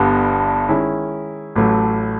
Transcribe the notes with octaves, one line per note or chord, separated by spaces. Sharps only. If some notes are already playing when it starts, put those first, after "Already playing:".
Already playing: G1 G2 D3 G3 B3
D#3 G#3 C#4 E4
A1 A2 F#3 A3